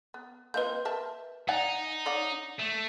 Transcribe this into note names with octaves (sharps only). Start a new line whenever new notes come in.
B3
A#3 C4 F4 B4 D#5 G6
A#4 E5 A5
D#4 D5 F#5 G#5
C#5 D5 F#5
A3